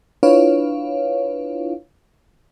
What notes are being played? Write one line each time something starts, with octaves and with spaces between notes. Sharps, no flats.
D4 E4 F4 B4 C#5 F5